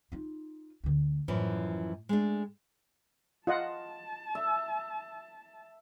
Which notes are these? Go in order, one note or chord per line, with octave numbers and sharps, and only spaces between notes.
D#4 F4
D2 D3
F#2 A2 E3 F3
G#3 A3 D4
F4 D#5 F#5 A5
E5